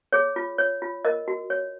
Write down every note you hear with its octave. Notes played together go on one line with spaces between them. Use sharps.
G#4 C#5
F4
C#5
F4
A#4 D#5
F#4
C#5